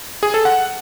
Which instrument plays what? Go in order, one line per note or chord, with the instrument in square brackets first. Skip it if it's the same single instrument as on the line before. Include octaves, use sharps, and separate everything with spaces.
[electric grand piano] G#4
A4
F#5